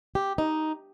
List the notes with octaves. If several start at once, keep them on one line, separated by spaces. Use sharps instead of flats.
G4
D#4